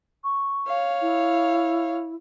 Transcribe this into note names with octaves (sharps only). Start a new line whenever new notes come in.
C#6
C#5 F5
E4